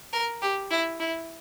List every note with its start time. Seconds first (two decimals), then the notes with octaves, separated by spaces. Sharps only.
0.13 A#4
0.42 G4
0.71 E4
1.00 E4